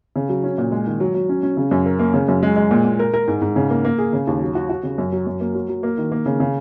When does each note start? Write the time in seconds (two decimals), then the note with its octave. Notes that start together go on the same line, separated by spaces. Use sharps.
0.16 C#3
0.29 F#3
0.44 C#4
0.58 A#2
0.72 G#3
0.87 D#3
1.00 F#3
1.14 F#3
1.29 C#4
1.43 C#4
1.57 C#3
1.71 F#2
1.86 A#4
1.99 A#3
2.14 C#3
2.28 F#2
2.43 G#3
2.56 G#3
2.71 A#2
2.85 A#2
2.99 A#4
3.14 A#4
3.28 G#2
3.41 G#2
3.56 C#3
3.70 A#3
3.85 A#3
3.98 G#4
4.13 C#3
4.27 D#2
4.41 F#3
4.55 F#4
4.69 F#4
4.83 C#3
4.98 F#2
5.12 F#3
5.27 F#2
5.40 A#3
5.55 F#3
5.69 F#3
5.83 A#3
5.98 D#3
6.12 A#3
6.26 C#3
6.40 C#3